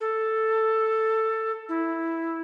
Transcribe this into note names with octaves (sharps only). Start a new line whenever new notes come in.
A4
E4